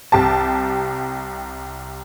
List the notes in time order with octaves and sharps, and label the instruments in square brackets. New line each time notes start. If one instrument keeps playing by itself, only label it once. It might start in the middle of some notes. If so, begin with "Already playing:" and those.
[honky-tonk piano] C2 G4 A5